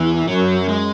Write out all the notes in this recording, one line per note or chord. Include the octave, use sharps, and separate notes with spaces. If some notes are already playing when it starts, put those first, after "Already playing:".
Already playing: E2 E3
F#2 F#3
G#3